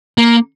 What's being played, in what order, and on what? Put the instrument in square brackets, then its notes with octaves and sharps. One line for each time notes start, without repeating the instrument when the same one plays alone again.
[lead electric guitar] A#3